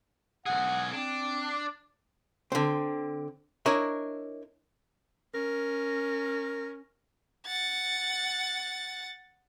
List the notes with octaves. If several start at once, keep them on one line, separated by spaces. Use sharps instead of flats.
B1 G#4 F#5
C4 D4
D3 C4
D4 E4 A#4 C#5 D#5 E5
C#4 A#4
F#5 A6